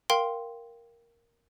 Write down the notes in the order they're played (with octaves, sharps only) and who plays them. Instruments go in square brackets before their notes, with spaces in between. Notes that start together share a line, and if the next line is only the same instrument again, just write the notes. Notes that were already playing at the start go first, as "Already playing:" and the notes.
[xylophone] A#4 F5 G5 C6